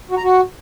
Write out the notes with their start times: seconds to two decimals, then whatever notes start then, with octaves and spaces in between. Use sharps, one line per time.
0.11 F#4
0.17 A#5
0.24 F#4